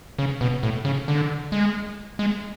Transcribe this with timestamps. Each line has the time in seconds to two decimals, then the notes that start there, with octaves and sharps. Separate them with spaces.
0.19 C#3
0.41 B2
0.63 A2
0.85 C#3
1.08 D3
1.52 G#3
2.19 G#3